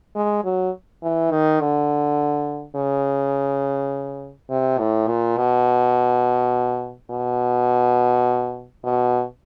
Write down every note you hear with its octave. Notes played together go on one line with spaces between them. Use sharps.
G#3
F#3
E3
D#3
D3
C#3
C3
A2
A#2
B2
B2
B2